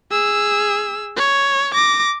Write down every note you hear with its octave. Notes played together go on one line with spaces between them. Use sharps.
G#4 E6
C#5
D6 A#6